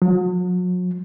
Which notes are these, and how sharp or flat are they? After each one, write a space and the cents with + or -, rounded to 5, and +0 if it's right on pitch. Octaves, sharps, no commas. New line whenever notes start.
F#3 -40